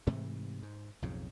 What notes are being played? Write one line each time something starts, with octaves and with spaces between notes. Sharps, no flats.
G#2 C3 E3 A3
G#2
B1 F2 G#2 C#3